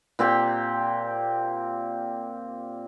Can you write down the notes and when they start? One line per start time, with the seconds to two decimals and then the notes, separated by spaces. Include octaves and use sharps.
0.19 A#2 C4 G4 G5